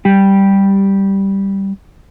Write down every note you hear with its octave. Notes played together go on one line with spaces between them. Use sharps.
G3 G4